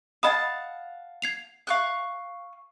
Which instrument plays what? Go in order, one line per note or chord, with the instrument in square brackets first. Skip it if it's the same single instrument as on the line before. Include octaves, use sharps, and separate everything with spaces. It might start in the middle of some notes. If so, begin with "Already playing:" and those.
[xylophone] D#5 B5 D#6 [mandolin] F5 F#5 A5
[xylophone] G#6 C7 F7
[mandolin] F5 C#6 F#6